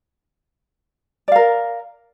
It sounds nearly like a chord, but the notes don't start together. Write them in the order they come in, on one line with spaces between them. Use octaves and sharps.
D5 F5 A#4